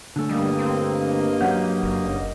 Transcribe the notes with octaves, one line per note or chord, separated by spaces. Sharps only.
D3 A3 C#4
G2 G3 A#3 D#5
C4
F#3 C#4 F#5 G6
F#1